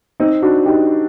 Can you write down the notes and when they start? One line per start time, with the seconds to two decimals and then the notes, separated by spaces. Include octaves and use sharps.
0.20 C4 D#4
0.42 D4 F#4
0.65 D#4 G4